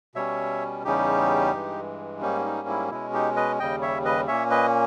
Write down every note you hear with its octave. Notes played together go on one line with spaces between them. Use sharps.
B2 G3 C#4 C#5 E5
E2 C#3 G3 C#4 D#4 G4
G2 E3 G#3
G#2 G3 A#3 C#4 D#4
D#4
E4
B2 G#3 C#4 E4
D#4 G4
B4 D#5
D#2 C#3 G3 D#5 G5
C#5 E5
B4 D#5
A#2 A#3 C#4 C#5 E5
B4 D#5